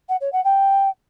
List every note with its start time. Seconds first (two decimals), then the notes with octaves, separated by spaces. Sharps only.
0.09 F#5
0.20 C#5
0.32 F#5
0.44 G5